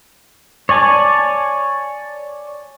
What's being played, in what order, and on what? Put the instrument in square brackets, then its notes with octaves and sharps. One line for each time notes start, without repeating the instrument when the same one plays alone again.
[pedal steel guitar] C#5 D5 G#5 A5